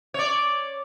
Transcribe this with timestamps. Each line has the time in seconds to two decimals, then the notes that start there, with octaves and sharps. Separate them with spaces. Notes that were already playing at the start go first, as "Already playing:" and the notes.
0.14 C#5 D5